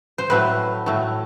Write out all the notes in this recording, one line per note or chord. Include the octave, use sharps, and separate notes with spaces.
C5
A2 F#3 A3 B4
A2 F#3 A3